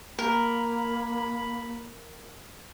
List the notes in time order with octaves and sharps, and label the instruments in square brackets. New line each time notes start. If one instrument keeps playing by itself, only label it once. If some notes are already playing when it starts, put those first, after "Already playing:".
[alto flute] A#3 [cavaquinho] A#4 [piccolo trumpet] B5